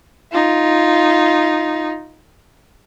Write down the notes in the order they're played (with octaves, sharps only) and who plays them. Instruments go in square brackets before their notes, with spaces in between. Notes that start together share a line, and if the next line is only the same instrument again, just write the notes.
[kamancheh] D#4 F4